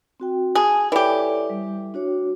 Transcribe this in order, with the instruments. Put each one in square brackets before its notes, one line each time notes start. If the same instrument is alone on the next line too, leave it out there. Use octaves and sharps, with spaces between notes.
[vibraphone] C4 F#4 G5
[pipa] G#4 [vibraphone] A5
[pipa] E3 G4 [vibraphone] A4 C#5 D5
[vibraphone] G3
D4 F#4 C#5